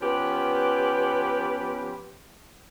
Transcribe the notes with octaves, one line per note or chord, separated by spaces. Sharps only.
F3 B3 C#4 G4 B4